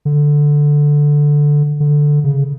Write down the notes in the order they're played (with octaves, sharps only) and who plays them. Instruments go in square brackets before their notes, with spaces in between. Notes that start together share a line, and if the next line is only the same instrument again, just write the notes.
[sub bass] D3
D3
C#3